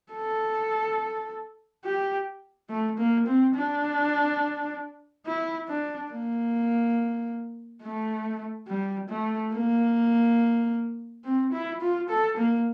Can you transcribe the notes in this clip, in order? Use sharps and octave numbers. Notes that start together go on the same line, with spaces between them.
A4
G4
A3
A#3
C4
D4
E4
D4
A#3
A3
G3
A3
A#3
C4
E4
F4
A4
A#3